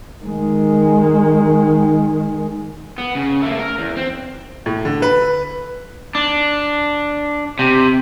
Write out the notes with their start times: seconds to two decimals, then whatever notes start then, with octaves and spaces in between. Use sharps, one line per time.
0.24 D#3 G#3
2.98 B3
3.15 C#3
3.42 A3 A#3
3.59 A#4
3.78 E2
3.97 C4
4.66 A2
4.85 D3
5.02 B4
6.15 D4
7.59 C3